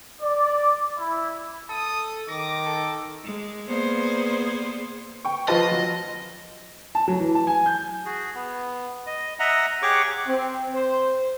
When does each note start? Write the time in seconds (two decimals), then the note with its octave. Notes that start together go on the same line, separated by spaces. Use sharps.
0.21 D5
0.97 E4
1.69 A4 D#6
2.29 D#3 D6 A#6
2.66 A4
3.25 G#3
3.67 A#3 B3 G#4 C5 D5
5.25 G5 C#6
5.48 F3 F4 B4 C5 D#5 A5
5.71 F#3
6.95 A5
7.08 F#3
7.20 E3
7.35 A5
7.47 G#5
7.66 G6
8.05 F#4 G#4
8.34 B3
9.07 D#5
9.39 D#5 E5 F#5 A#5
9.83 G4 G#4 C#5 F#5 C#6 D6
10.28 C4
10.74 C5